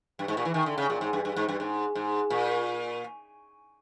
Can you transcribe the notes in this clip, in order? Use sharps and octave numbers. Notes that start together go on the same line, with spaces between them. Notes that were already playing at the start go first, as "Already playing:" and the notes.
G2
G#2
A#2
E3
D#3
D3
C#3
A#2
G#2
G2
G2
G#2
G2
G#2
G#2
A#2